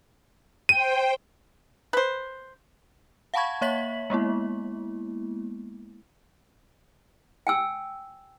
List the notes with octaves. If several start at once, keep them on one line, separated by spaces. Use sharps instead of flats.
C5 G5 D#7
B4 C5
F5 F#5 A5 B5 C#6 G#6
A#3 C#5 E5 B6 F#7
G#3 A#3 B3 E4
G5 G#5 E6